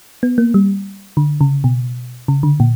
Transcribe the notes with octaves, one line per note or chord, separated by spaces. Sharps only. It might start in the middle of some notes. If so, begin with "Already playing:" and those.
B3
A#3
G3
D3
C#3
B2
C#3
D3
A#2